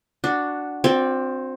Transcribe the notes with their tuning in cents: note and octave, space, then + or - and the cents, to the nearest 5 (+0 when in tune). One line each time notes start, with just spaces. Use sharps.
D4 +0 F#4 +0
C4 +5 F#4 -45 D5 +0